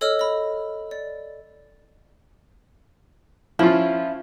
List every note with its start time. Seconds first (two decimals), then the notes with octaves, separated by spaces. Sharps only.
0.01 A4 C#5 D#5 E6 F6
0.19 D#5 B5
0.91 D5
3.59 F3 C#4 E4 F4